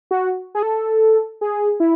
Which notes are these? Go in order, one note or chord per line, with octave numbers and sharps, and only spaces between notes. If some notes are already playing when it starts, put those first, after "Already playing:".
F#4
G#4
A4
G#4
E4